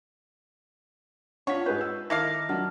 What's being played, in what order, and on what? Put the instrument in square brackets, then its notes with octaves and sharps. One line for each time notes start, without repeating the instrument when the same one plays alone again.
[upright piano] D4 F4 [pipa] C#5 [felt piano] F#5 B6
[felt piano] G#2 G#4 B4 [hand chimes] G6
[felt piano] E6
[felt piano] D#3 A#4 D6 [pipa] E4 A4 F5 [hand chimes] A#6
[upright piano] F#3 D4 [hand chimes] F#5 A5 F6